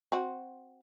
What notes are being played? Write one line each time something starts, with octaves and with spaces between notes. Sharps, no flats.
C4 F#4